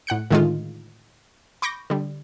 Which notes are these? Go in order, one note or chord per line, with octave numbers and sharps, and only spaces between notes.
A2 F#5 F#6 C#7
A2 D3 D#3 G#3 A3 F4
B5 C#6 D6 G6 A#6
D3 G3